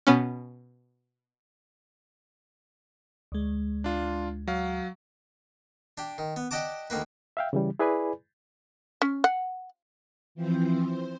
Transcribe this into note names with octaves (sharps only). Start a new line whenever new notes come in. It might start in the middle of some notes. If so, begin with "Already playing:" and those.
B2 B3 C#4
D2 G#3
D4 F4
F#3 F5
D4 G4
D#3
B3
G4 D5 D#5 F#5 A5 D6
D2 D#3 A#3 B4
E5 F5 G5
C#3 E3 G3
E4 G#4 B4 D5 G#5 B5
C#4
F#5
E3 F3 C4 C5
C5